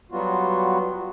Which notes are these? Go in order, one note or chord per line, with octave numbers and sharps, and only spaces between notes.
F#3 G3 B3 F4 F#4